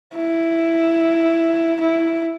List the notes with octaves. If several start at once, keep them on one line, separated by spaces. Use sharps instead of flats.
E4
E4